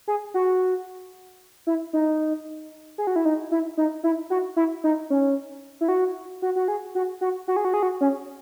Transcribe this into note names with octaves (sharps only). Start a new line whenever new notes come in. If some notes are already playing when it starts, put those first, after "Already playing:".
G#4
F#4
E4
D#4
G#4
F#4
E4
D#4
E4
D#4
E4
F#4
E4
D#4
C#4
E4
F#4
F#4
F#4
G#4
F#4
F#4
F#4
G#4
F#4
G#4
F#4
C#4